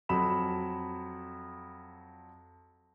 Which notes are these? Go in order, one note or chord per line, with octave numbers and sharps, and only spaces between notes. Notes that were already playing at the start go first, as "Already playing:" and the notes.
F2 F#3 B5 E7